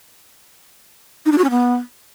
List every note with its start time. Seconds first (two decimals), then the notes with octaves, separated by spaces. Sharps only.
1.26 D#4
1.32 D4
1.38 F#4
1.44 C#4
1.50 B3